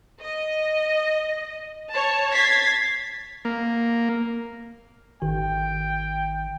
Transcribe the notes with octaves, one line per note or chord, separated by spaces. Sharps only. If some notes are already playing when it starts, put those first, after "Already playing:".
D#5
C#5 A5
G#6 A6 B6 C7
A#3
G#1 D#3 G5